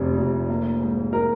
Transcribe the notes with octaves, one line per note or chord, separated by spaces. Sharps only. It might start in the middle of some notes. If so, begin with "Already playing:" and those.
Already playing: F1 F2 C3
F1
A#3
G#2
A#4